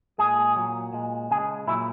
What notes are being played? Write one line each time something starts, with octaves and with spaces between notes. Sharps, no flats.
A#2 G#3 G#4
A#2 F#3
A#2 G#3
C#3 G#3 G#4
A#2 F#3 E4